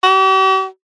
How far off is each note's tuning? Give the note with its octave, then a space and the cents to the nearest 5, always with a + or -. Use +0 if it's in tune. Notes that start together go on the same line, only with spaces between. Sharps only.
G4 -45